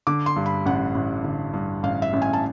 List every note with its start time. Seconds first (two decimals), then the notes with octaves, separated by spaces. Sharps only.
0.07 D3 D6
0.26 C6
0.36 G2
0.46 B5
0.66 A1 F#5
0.95 A1
1.24 D3
1.54 G2
1.83 A1 F5
2.02 E5
2.13 A1
2.22 G#5
2.33 A5